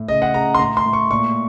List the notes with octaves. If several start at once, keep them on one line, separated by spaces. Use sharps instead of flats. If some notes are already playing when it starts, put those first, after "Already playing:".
Already playing: A2
C#3 D#5
F#5
C#3 A#5
C6
A2 A#5
C6
A2
C#6
A#2 C#6